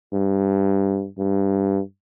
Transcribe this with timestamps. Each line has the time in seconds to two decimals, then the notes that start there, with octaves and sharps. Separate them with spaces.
0.13 G2
1.18 G2